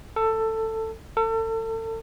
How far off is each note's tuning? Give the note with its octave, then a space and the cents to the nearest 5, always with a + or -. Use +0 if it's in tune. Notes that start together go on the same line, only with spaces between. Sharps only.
A4 +15
A4 +35